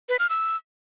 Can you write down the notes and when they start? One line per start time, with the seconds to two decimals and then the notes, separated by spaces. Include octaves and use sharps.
0.09 B4
0.19 F6
0.30 E6